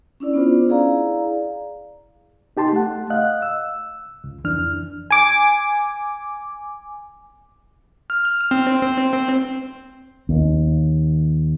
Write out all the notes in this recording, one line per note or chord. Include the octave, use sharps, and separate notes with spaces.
C#4 D4 E4 D5
B3 C#4 D4 F4 C5
E4 G#4 D5 F5 A#5
D#4 G4 A5 C6
A3 F#5
D#5 F5 F#6
E6
C#2
F2 E3 D4 F6
G#5 D6
F6
C4
D#2